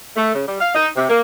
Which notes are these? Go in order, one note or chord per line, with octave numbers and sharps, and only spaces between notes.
A3
C#3
G3
F5
D#4
C3
A#3